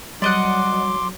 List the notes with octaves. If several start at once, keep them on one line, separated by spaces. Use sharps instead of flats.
F#3 G3 D5 D#5 F#5 C6 D6